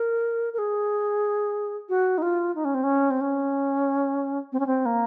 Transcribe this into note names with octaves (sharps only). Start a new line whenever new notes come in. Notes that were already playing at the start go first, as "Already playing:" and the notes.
Already playing: A#4
A#4
G#4
F#4
D#4
F4
D#4
C#4
C4
C#4
C4
C#4
C4
C#4
C4
A#3